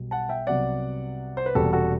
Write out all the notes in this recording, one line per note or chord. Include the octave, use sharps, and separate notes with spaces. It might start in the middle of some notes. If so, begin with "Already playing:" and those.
Already playing: B1 B2 G3
F#5 A5
E5 G5
C2 C3 F#3 B3 D5 F#5
C5
B4
E1 E2 C3 G3 F#4 A4
F#4 A4